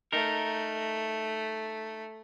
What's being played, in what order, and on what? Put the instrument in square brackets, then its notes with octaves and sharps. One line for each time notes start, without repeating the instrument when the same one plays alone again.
[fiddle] A3 [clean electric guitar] D#4 A#4